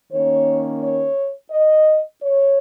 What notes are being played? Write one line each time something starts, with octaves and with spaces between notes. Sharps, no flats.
D#3 A#3 C#4 C#5
C#5
D#5
C#5